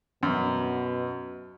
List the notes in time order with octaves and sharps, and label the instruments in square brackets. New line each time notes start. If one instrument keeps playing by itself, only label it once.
[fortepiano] F#2 [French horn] B2